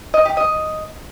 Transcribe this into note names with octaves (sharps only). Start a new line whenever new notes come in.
D#5
G4
D#5